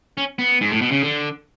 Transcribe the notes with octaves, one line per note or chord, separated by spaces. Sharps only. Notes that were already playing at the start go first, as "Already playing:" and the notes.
C#4
B3
G#2
A2
B2
C#3
D3